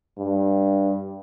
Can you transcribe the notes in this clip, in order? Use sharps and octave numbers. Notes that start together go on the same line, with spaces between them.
G2